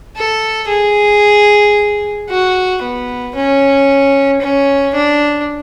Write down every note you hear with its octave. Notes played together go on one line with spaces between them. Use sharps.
A4
G#4
F#4
B3
C#4
C#4
D4